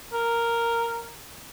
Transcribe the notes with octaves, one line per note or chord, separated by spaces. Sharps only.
A#4